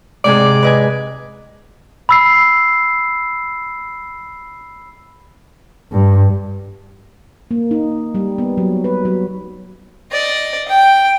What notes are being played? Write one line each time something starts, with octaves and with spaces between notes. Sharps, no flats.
G#2 C3 G#4 D5
B4 D#5 G#5
B5 E6 C7
G2
A#3
D#4
G3
B3
F#3
B4
F#3
D5 D#5
G5